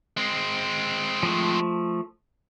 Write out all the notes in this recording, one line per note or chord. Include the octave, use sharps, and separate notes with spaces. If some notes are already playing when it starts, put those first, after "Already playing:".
G#3 C4
F3 A3